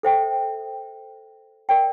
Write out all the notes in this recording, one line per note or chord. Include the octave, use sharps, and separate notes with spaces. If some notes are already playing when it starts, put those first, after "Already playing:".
A4 C5 E5 G5
A#4 D5 G5